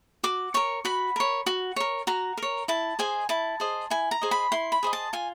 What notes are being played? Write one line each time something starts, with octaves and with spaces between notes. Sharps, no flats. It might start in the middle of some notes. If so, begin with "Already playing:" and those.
F#4 D6
A#4 C#5 C#6
F#4 B5
A#4 C#5
F#4
A#4 C#5
F#4 A#5
A#4 C#5
E4 A5
G#4 C5 D#5 G#5
E4 A5
G#4 C5 D#5
E4 G#5
A#5
G#4 C5 D#5
B5
E4 C6
B5
G#4 C5 D#5
A5
F4 G#5